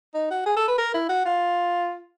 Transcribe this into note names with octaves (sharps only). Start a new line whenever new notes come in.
D#4
F#4
G#4
A4
B4
A#4
E4
F#4
F4